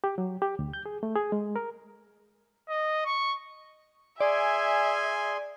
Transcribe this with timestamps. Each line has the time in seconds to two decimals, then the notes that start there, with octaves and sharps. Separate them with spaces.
0.04 G4
0.18 F#3
0.42 G4
0.59 D2
0.73 G6
0.86 G#4
1.03 A3
1.16 G#4
1.32 G#3
1.56 A#4
2.68 D#5
3.05 C#6
4.21 G#4 D5 E5 G#5 C6